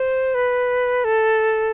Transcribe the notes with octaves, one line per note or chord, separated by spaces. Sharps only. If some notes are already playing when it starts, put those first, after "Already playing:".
Already playing: C5
B4
A4